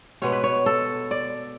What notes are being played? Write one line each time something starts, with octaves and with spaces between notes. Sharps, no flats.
B2 G#3 B3 C#5
B4
C#5
A4
D5